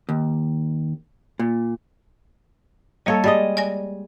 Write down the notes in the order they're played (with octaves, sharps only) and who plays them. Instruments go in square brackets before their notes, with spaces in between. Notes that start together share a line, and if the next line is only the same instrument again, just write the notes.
[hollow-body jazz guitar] D#2
A#2
[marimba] G3 A#3 F5 [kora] A4 C#5 D#5
[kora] G3 G#3 D#5 [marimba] A6
[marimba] D5 G#5 A#6